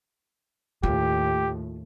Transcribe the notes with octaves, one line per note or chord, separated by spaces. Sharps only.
D#2 A2 F4 G4